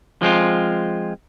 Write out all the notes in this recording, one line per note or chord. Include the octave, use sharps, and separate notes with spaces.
F3 G#3 C4 F4